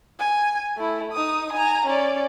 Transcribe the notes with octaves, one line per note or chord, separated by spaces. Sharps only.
G#5
A3 E4
D#4 D#6
G#5 A#5
C#4 D5